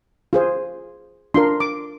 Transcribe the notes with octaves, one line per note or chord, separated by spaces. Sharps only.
F4 G#4 C5
D4 F4 A#4 C6
D6